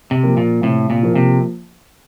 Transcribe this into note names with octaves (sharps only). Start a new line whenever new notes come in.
C3
F3 A#3
A#2
A2 C3
A#2
F3 A#3
C3